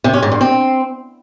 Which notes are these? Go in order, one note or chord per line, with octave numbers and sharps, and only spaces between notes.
C3
C#4
G#2
G2
C4